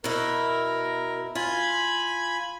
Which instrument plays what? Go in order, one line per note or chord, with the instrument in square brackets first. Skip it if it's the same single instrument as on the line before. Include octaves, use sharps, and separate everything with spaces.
[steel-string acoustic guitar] B2 E4 [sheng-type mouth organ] A#4
[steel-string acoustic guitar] F4 [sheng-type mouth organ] G#5 B5